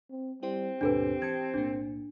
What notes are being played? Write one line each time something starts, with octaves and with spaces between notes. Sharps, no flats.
C4
G3 C4 E4 G4 C5
D#2 G#2 B2 D4 G4 A4 B4
E3 A5 G#6 C#7
B1 A2 A#3 D4